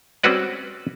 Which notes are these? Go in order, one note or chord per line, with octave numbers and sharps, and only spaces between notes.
G3 C4 C#4 F#4 B4 D5